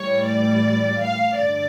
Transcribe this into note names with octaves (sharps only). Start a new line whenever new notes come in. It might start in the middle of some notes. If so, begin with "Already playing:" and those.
Already playing: A2 E3 G3 C#5
D5
F5
G2 D3 D5